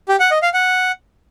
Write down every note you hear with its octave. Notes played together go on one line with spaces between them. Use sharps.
G4
F#5
D#5
F5
F#5